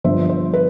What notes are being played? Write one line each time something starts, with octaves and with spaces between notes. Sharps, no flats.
G1 G2 F3 C5 E5
C5
B4